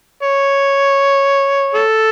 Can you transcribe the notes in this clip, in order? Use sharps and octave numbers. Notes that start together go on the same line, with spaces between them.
C#5
A4